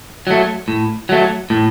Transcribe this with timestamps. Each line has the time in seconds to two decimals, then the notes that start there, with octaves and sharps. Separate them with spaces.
0.27 F#3 A3
0.68 A2
1.09 F#3 A3
1.50 A2